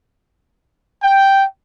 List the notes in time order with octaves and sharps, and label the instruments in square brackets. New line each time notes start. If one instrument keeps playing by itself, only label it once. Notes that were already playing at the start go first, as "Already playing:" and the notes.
[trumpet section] G5